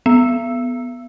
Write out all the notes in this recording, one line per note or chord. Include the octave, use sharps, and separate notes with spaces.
B3